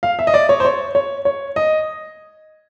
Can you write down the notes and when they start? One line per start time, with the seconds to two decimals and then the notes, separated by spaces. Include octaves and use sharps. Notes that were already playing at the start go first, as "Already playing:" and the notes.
0.03 F5
0.19 E5
0.27 D#5
0.34 D5
0.49 C#5
0.60 C5
0.65 C#5
0.95 C#5
1.25 C#5
1.56 D#5